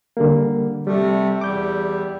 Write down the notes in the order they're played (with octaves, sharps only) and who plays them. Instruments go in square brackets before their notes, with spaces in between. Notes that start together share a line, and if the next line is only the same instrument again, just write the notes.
[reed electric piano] D3 G3 A#3
[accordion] C3 A3 [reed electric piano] G3
[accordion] E2 G3 [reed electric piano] D6 G6